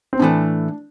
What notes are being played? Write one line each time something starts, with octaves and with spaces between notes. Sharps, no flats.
C4
A2 E3 A3 D4